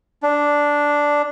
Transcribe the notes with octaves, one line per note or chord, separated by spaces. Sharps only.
D4